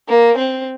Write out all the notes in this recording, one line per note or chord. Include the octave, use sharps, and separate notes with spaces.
A#3
C4